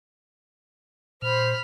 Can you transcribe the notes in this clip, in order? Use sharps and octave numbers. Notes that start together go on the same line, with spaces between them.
A#2 C5 B5 F6